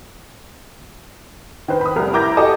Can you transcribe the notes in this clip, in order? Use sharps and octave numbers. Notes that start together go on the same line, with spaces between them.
D#3 B4 C5
B5 D#6
F1 C2 A#4
E4 A#5 D6 G6 G#6 A#6
F#4 G4 A4 D#5 A5 D6